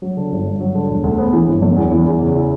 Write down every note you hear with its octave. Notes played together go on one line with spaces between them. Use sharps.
F#3
D3
G1
G2
F#3
D3
E1
D2
B3
E3
G1
F#2
E2
E3
E2
C#3
E4